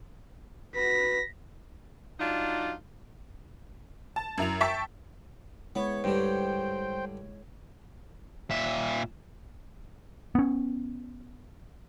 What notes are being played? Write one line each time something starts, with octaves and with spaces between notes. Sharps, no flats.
F#4 B4 A#6 B6
F#3 D4 D#4 F4
A5
F#2 E4 F7
E5 G5 A5 C#6 A6 B6
G#3 B3 E4 C#5
G2 D3 C5 G5
A#2 E5
B3 C#4